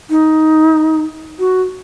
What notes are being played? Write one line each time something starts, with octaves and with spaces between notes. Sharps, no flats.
D#4
F#4